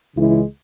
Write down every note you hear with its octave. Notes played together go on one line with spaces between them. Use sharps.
C#2 C#3 E3 G#3 E4